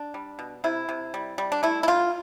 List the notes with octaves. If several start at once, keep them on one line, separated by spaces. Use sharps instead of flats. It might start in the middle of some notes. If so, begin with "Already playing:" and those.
Already playing: D4
G3
B2
C3 E4
C3
G3
G3
D4
A3 E4
E4
D3 F4